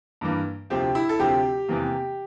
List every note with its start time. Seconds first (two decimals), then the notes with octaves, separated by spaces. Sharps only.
0.21 G2 E3 A#3
0.70 D2 C3 F3 C4 G4
0.95 E4
1.09 A4
1.19 D2 C3 F3 C4 G4
1.69 E2 C3 E3 A#3